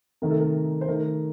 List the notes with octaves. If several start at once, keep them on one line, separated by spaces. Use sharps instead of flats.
C3 D#3 A3 D#4 A#4
A4
A#4
C5
D#3 A3 D#4 A#4